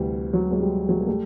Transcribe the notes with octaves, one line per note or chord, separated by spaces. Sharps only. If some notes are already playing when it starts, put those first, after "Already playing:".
Already playing: D2 C3 E3 G3
F#3
G3
F#3 G#3
G3
F#3 G#3
A#3
G3 A3